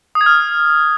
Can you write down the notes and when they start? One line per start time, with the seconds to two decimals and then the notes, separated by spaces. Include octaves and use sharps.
0.15 D#6
0.21 G#6
0.26 F6